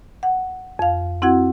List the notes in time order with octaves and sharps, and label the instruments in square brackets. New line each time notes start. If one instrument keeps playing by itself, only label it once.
[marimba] F#5
F2 F5
C4 E4 F#4 F#5 G#6